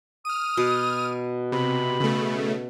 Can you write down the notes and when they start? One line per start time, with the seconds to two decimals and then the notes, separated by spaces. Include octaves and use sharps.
0.25 D#6 F6 D#7
0.57 B2
1.52 C3 B5
2.00 C#3 A3